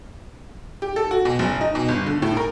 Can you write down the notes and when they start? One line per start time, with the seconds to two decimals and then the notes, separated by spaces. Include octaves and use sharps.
0.82 G4
0.96 A4
1.11 F#4
1.25 B2
1.39 F#1
1.61 D#4
1.75 B2
1.88 G1
2.06 D3
2.22 A2
2.37 A#4